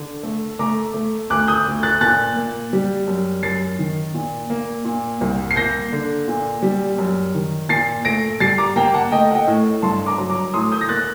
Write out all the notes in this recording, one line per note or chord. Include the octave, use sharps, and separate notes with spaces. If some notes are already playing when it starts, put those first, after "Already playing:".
Already playing: D3
A3
A3 A#5 D6
A3
D2 D6 F#6
D#6 G6
D2
F#6 A6
A#2 F#6 A6
A#3
G3
F#2
F#2 A6 C7
D#3
A#2
A#3
A#2
C2
C7
A#3 G6 A#6
D3
A#2
G3
F#2
D#3
A#2 A6 C7
A3 A#6 D7
G3 A6 C7
A#5 D6
A#3 G5 A#5
F#5 A5
A3 D#5 G5
F#5
D#5 G5
A2
G2 A5 C6
A#5 D6
F#3
A#5 D6
A2 C6 D#6
D#6 G6
A#6
A#3 F#6 A6